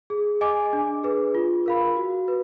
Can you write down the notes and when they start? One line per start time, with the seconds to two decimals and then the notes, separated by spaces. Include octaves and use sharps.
0.10 G#4
0.41 D#5 G#5 D6
0.73 D4
1.03 G#4 B4
1.35 F4
1.66 A#4 F5 B5
1.97 F#4
2.28 B4